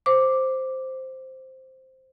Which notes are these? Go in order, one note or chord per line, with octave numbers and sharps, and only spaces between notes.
C5 D6